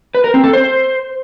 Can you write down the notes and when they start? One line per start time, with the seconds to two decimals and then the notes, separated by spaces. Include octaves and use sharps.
0.15 B4
0.24 A#4
0.34 C4
0.44 A4
0.53 C5